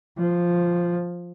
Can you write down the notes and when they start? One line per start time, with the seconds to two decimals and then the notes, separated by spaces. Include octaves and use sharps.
0.19 F3